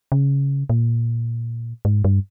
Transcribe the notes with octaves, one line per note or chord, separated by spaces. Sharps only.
C#3
A#2
G#2
G2